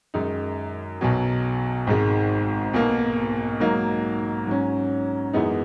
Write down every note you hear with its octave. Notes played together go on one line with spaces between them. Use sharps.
F#2 D#3 G#3 D#4
B1 B2 F#3
G#1 G#2 D#3 G#3
B1 B2 A#3
G#2 F#3 A#3 D#4
G#2 F#3 C#4
F#2 E3 G#3 B3 D#4